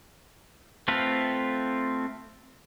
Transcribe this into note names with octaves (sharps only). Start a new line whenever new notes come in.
A3 C4 F4 A4 B4